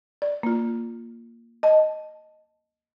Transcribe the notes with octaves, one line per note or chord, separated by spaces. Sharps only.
D5
A#3 F4
D#5 A5